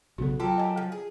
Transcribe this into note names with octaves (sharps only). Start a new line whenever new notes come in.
B1 C#3 B3 F#4 A4
F#3 F4 G4 A4 A#4
D#5 G#5
F3
G#4